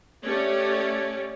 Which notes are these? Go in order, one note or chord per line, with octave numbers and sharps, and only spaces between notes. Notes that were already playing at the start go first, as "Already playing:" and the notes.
A3 C#4 G4 C#5 D5